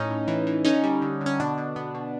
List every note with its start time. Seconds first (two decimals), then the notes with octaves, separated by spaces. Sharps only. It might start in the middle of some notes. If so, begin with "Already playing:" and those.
Already playing: A2 C#4 D#4
0.10 A2
0.28 E3
0.47 E3
0.65 D3 C#4 D#4
0.84 G3
1.02 D3
1.21 D3
1.26 C#4
1.39 B2 D4
1.58 B2
1.76 B3
1.94 B2